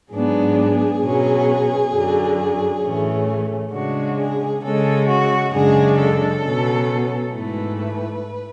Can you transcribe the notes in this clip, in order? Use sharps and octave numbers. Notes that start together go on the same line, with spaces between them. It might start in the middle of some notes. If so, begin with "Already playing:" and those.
G#2 F#3 B3 D4 G#4
B2 F#3 C#4
F#2 D3 F#3
A2 E3 A3 C#4
C#3 G#3 D4 F#4
G#4
C#3 G#3 C#4 A4
F#4
F#2 C#3 G#3 D4 G#4
A4
B2 F#3 C#4
G#2 E3 A3 B4